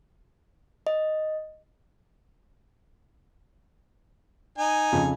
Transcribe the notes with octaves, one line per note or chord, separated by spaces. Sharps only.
D#5
D#4 G#5
F2 C#3